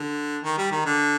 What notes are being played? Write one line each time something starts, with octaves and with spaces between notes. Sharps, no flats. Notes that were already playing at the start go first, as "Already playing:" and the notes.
Already playing: D3
D#3
G3
D#3
D3